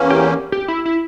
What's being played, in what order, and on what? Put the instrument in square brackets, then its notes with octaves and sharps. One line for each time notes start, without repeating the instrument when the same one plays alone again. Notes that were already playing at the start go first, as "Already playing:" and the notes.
Already playing: [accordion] E2 E3 A#3 C#4
[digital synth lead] G4
G4
E4
E4